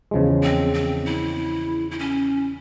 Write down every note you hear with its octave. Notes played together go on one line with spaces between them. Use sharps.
E2 C#3 F3 G#3
C4
C4
E4
E4
C#4